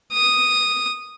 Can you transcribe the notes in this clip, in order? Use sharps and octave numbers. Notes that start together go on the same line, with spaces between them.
D#6